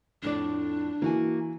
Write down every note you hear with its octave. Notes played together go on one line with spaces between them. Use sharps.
F2 A2 D4 D5
E3 A#3 F#4 G#5